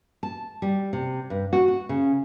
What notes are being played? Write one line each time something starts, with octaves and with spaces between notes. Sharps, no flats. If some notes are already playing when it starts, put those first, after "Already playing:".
A5
G3
C3
G2
F#4
F#4
C#3